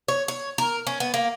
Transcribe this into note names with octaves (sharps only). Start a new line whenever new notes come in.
C#5
C#5
A#4
C#4
B3
A#3